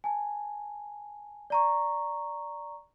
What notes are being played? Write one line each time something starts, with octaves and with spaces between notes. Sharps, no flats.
G#5 A5
D5 A#5 C#6